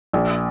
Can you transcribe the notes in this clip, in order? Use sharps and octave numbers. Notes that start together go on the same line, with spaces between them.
A#1